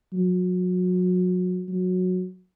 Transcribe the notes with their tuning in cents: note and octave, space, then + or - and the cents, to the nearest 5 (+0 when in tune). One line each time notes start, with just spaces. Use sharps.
F#3 -30
F#3 -15